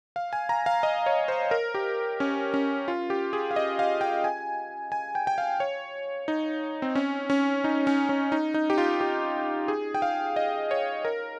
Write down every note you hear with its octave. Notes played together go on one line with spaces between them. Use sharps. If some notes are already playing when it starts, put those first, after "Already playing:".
F5
G#5
A#5
F5
D#5
C#5
C5
A#4
G4
C#4
C#4
F4
G4
G#4
F5
D#5
F5
G5
G#5
G#5
G5
G5
F5
C#5
D#4
C4
C#4
C#4
D#4
C#4
C#4
D#4
D#4
G4
F4
G4
G#4
G5
F5
D#5
C#5
A#4